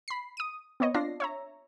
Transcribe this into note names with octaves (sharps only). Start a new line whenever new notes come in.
B5 C7
D#6 D#7
B3 C4 C#5 D#5
D4 F4 A#6 C7
C#5 E5 A#5